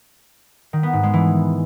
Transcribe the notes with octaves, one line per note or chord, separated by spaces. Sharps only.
D#3
B3
G#2
G#3
E3